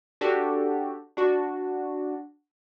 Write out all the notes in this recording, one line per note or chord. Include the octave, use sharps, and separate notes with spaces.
D4 F#4 G4 A4
D4 F#4